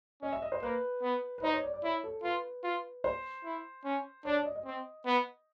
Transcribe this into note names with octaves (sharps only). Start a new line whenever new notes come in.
C#4 D#5
E5
D#5
C5
A#3 B4
B3
B4
D#4 C5
C#5
D5
D5
E4 C#5
A4
F4 B4
F4
C5
E4
C#4
D4 C#5
D5
D#5
D#5
C4
B3